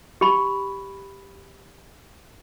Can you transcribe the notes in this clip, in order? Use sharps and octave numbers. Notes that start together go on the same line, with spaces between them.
G4 B5